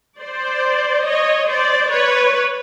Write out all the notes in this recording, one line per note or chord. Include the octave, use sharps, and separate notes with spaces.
C5 D5
C#5 D#5
C5 D5
B4 C#5